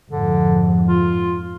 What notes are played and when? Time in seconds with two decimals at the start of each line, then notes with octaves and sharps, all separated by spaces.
0.11 F2 G#2 D3
0.88 F4